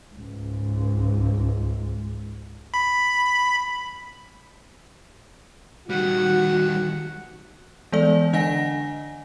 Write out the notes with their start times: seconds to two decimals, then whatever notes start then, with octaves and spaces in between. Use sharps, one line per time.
0.15 C#2 G#2
2.74 B5
5.90 D#3 G3 F#4 F#5
7.92 E3 G#3 B3 A4 D5
8.33 D3 D4 D#5 F#5 G#5 A#6